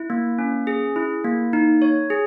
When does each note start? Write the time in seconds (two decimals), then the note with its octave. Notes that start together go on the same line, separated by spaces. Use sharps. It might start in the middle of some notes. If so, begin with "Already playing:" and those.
Already playing: E4
0.10 A#3
0.38 C#4
0.67 G#4
0.96 E4
1.24 A#3
1.53 D#4
1.82 C#5
2.10 G#4